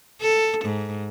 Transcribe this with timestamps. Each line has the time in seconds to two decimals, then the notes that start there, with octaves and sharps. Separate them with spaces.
0.22 A4
0.65 G#2